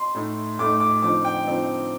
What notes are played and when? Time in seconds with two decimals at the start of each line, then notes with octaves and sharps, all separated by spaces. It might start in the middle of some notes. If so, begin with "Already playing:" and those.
Already playing: C6
0.15 A2 A3 D#4
0.59 A2 A3 D#4 D6
0.80 D6
1.02 D3 F3 C4 D#4 D6
1.25 G5
1.46 D3 F3 C4 D#4